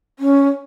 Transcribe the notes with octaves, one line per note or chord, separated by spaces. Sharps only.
C#4